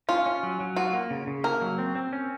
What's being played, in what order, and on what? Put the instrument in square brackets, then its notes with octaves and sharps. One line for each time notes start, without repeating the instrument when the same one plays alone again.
[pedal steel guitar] C#4 [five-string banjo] F4
[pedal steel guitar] C#4
F#3
F#3
[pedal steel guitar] F4 [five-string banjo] F#4
[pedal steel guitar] A#3
C#3
C#3
[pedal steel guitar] A#3 [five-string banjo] A#4
[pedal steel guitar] F#3
C4
C4
C#4